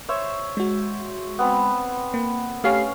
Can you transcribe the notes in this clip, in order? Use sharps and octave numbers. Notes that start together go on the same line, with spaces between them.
C5 C#5 E5
G#3 F#4
B3 C4
A#3
A3 C#4 G4 F5 C7